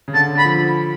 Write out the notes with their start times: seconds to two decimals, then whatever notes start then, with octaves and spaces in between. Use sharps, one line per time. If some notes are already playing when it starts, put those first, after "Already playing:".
0.08 C#3
0.14 D3 A5
0.35 D3 B5
0.45 F3